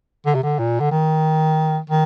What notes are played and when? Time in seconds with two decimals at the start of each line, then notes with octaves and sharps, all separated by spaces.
0.26 D3
0.35 C3
0.43 D3
0.59 A#2
0.80 D3
0.91 D#3
1.90 D#3